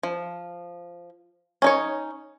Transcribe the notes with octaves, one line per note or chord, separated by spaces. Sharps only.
F3
C#4 D#4 C#5